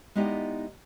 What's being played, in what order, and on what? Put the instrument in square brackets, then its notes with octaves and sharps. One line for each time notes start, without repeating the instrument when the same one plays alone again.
[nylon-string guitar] G#3 B3 D#4 E4 G4 D5